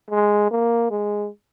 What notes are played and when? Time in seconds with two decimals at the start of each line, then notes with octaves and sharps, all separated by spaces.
0.10 G#3
0.51 A#3
0.91 G#3